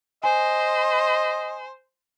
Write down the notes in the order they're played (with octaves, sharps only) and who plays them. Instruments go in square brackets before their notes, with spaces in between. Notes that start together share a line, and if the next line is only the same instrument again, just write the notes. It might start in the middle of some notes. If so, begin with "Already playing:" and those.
[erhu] C5 [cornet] D#5 [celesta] G#5